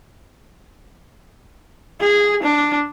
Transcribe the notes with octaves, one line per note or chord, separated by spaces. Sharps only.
G#4
D4